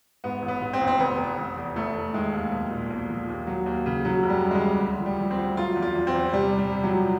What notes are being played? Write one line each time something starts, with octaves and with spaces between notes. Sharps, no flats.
G#2 B3
A1
B3
G#2
C4
A1
C4
F1 B3
F1
F1
E2
F1 A3
F1
D#3 G#3
D#2
B1
A#2
B1
F3
D#2
F#3
D#2
C#3
C#3 F#3
F#1
G3
F#1
G#3
G3
E2
D2
F3
G3
F3
C4
D2
F#3 F4
E2
F4
E2
C4
E2
C3 G3
C3
G3
C3
F#3
F3